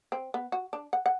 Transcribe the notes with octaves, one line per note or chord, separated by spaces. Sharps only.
C4
B3
F#4
D4
F#5
F#5